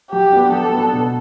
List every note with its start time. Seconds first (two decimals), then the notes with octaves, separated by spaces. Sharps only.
0.12 F#3 G4
0.32 B3 D4
0.52 F#3 A4
0.72 B3 D4
0.93 B2